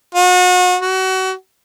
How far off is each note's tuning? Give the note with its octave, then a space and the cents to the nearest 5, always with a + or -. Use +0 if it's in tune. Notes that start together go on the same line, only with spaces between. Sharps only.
F#4 -35
F#4 +30